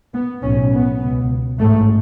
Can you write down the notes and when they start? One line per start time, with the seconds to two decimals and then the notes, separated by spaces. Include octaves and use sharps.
0.13 B3
0.42 B1 A2 C#4
0.71 B3
1.01 C#2 B2
1.58 A1 G#2 A3